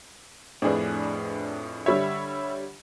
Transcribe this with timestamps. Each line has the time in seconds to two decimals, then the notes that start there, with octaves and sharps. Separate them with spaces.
0.62 F2 A2 D4 G#4 B4
1.86 D3 G3 C#5 E5 B5 E6